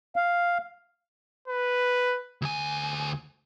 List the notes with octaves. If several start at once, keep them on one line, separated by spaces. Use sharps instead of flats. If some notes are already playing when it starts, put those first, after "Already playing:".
F5
B4
D2 G#5